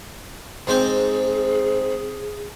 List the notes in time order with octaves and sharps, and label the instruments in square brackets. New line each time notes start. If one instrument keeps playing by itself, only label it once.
[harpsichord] G#2 C4 C5 [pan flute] G#4